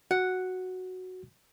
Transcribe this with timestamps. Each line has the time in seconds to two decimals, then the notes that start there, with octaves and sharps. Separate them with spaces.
0.11 F#4 F#5